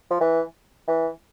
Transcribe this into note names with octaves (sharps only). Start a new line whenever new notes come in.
F3
E3
E3